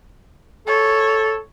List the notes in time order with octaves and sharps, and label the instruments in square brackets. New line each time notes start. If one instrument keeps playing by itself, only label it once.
[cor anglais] A4 [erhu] C#5